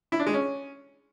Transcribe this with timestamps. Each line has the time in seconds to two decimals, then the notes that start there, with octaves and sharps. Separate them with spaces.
0.12 E4
0.19 D4
0.26 G#3
0.34 C#4